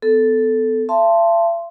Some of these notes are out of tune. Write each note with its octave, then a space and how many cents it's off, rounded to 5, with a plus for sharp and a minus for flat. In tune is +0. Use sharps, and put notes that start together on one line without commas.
B3 +30 A4 +0
E5 +45 A5 +5 C6 +0